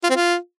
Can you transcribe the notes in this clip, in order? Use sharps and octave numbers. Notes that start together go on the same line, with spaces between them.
F4
C4
F4